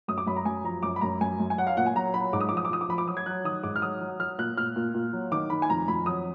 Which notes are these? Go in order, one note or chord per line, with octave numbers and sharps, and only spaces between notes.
F#2 D#6
D6
F#2 B5
A#5
F#2 G#5
F3 A#5
F#2 D6
B5
F#2 A#5
F#2 G#5
F#2
G#5
F#3 F#5
F5
A#2 F#5
G#5
F#3 A#5
F#3 B5
G#2 D6
D#6
F3 D6
D#6
D6
F3 D#6
D6
F3 B5
D6
F#3 D#6
G#6
F#3 F#6
D#3 D#6
G#2 D6
F6
F#3 D#6
F#3
F#3 F6
A#2 F#6
A#2 F6
A#2
A#2
F#3
D#3 D6
D#3 B5
G#5
F2 A#5
F2 B5
F#3 D#6